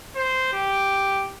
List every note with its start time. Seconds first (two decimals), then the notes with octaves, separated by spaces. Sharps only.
0.16 C5
0.53 G4